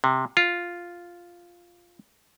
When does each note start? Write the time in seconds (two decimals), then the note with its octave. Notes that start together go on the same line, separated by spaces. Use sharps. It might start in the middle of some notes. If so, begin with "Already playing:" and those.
0.04 C3
0.37 F4